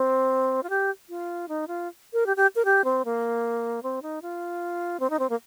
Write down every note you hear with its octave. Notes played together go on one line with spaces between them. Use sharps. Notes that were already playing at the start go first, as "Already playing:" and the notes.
Already playing: C4
F4
G4
F4
D#4
F4
A#4
G4
G4
A#4
G4
C4
A#3
C4
D#4
F4
C4
D#4
C4
A#3